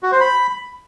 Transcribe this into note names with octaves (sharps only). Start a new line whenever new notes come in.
F#4
C5
B5